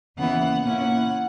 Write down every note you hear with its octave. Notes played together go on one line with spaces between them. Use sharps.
D#2 C#3 E3 B3 E4 F#5
A#2 A#3 C#4 E4 F#5